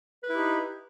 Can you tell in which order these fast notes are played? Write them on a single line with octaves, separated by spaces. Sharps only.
B4 E4 G4 D#4